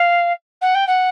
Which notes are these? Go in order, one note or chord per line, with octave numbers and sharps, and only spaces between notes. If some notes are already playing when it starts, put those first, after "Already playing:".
Already playing: F5
F#5
G5
F#5